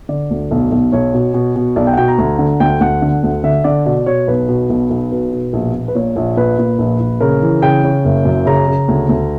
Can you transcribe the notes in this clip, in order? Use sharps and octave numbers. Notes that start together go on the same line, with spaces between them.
D3 D5
D2
B1
B1
B1 C#5
B2
B2
B2
B1 D5
G5
F#5
B2 G5
A#5
D2
D3
D2 G5
D2 F#5
D3
D2
D3 E5
D3 D5
B2 D5
B2 C#5
B1 B4
B2
B1
B1
B2 B4
B2
A#1
A#1
B4
A#2 C#5
A#1
A#2 B4
A#2
A#1
A#1
C#3 A#4
E3
C#3 G5
C#3
F#1
F#2
C#3 A#5
C#3
D2
D2